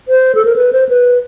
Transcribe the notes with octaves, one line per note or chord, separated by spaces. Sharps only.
C5
A4
A#4
B4
C5
B4